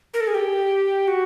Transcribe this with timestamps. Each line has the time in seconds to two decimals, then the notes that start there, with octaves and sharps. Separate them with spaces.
0.14 A#4
0.21 A4
0.27 G#4
0.35 G4
1.08 F#4